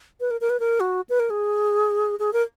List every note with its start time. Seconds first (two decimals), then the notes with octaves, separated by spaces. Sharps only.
0.21 B4
0.31 A#4
0.41 A#4
0.50 B4
0.60 A#4
0.80 F#4
1.09 B4
1.20 A#4
1.30 G#4
2.19 G#4
2.33 A#4